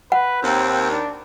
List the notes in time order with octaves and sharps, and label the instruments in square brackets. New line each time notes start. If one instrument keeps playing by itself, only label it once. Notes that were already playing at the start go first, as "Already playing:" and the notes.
[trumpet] B4 [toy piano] F#5
[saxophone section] D#2 [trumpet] C4
[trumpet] D4